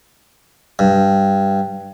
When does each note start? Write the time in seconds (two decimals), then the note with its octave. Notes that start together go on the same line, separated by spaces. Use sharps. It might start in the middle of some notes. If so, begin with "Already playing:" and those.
0.79 G2